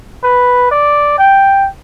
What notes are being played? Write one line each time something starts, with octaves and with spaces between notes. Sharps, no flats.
B4
D5
G5